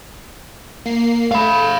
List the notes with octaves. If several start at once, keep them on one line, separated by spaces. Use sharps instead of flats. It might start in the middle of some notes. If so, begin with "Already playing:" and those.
A#3 C7
A3 F5 B5